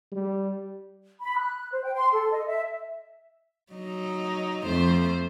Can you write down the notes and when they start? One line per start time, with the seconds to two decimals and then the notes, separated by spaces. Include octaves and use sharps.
0.12 G3
1.21 B5
1.38 F#6
1.71 C5
1.84 G5
1.95 C6
2.13 A4
2.32 D#5
2.47 E5
3.73 F#3 D#4
4.65 F2 A3 C5